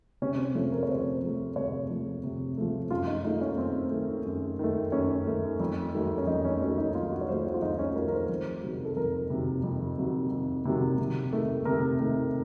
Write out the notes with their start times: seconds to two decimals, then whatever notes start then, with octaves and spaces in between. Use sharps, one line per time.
0.22 C3 C#4
0.39 C4
0.55 F3 A3 C#4
0.72 A#4
0.83 C#5
0.89 C3 C5
1.22 F3 A3
1.56 C3 C#5
1.90 F3 A3
2.23 C3
2.58 F3 A3
2.91 F#2 F4
3.07 D#4
3.24 D#3 A3 D#4
3.41 C#4
3.58 F#2 C4
3.91 D#3 A3
4.25 F#2
4.59 D#3 A3
4.92 F#2 C#4
5.27 D#3 A3
5.60 F2
5.94 D#3 F#3 A3
6.18 C#4
6.27 F2 D#4
6.45 C#4
6.61 D#3 F#3 A3 C#4
6.78 D#4
6.94 F2 F4
7.11 F#4
7.21 C#5
7.28 D#3 F#3 A3 C5
7.45 F#4
7.54 F4
7.62 F2 D#4
7.74 D#4
7.79 C#4
7.95 D#3 F#3 A3 A#4
8.08 A#4
8.13 C5
8.29 F2
8.63 C3 D#3 F#3
8.85 A4
8.96 F2 A#4
9.30 C3 D#3 F#3
9.64 F2
9.98 C3 D#3 F#3
10.31 F2
10.65 C3 D#3 F#3
10.98 C3
11.33 D#3 A3
11.65 C3 A#4
12.00 D#3 A3